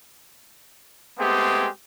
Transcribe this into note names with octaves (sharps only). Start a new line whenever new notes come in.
G#3 A3 B3 C4 G4 G#4